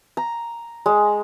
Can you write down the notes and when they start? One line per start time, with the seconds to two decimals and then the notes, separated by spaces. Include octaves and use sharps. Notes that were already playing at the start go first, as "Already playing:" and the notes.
0.17 A#5
0.86 G#3